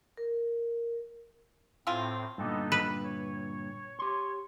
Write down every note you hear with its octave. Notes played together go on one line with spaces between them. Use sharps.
A#4
A2 C4 E4 F4 G#5
G2 A#2 D3 B3 D#4 A4
B4
C#5
G4 C6